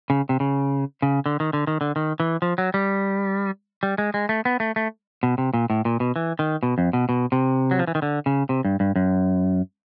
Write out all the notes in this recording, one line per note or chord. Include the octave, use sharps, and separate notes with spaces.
C#3
C3
C#3
C#3
D3
D#3
D3
D#3
D3
D#3
E3
F3
F#3
G3
G3
G#3
G#3
A3
B3
A3
A3
B2
C3
A#2
A2
A#2
B2
E3
D#3
B2
F2
B2
B2
C3
F#3
F3
E3
D#3
D3
C#3
C3
G2
G2
F#2